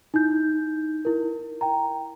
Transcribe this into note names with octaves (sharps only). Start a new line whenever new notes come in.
D#4 E4 G6
E4 A#4
G5 A#5